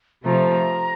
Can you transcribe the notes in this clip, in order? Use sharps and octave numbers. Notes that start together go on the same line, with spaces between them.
C3 F3 A3 A#5